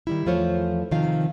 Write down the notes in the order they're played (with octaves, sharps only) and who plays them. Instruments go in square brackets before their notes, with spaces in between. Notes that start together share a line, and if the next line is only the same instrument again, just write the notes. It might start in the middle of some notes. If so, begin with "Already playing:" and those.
[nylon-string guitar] D#3 G3 E4
E2 F3 A3 F4 C5 C#5
C3 D#3 F3 F4 F5